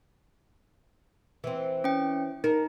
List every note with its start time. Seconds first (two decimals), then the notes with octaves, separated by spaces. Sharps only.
1.44 E3 C4
1.84 C#4 G5
2.44 D#4 A#4